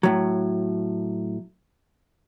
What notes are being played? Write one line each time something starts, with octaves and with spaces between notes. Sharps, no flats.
A2 F#3